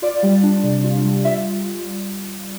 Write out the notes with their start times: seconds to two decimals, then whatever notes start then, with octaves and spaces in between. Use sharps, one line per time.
0.02 F4 D5
0.23 G3
0.43 D4
0.64 C3
0.84 F4
1.05 G3
1.25 F4 E5